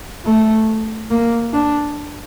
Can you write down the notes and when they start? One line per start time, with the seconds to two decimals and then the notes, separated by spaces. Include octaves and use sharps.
0.25 A3
1.10 A#3
1.53 D4